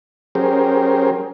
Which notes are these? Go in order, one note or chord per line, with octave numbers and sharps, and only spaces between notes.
F#3 C#4 G4 G#4 A#4 C5